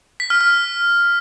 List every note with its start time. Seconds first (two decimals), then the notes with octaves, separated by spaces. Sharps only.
0.20 B6
0.30 F6
0.41 F6